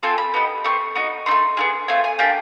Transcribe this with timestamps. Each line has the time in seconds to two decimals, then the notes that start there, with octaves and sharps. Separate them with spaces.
0.03 A3 C4 F4 A4 G#5
0.18 B5
0.34 B3 D#4 G4
0.64 A3 C4 C#6
0.95 B3 D#4 F#4
1.26 C4 D#4 C6
1.31 A3
1.57 B3 E4 G#4
1.88 A3 C4 F4 G#5
2.04 G#5
2.19 A#3 D4 G4 G5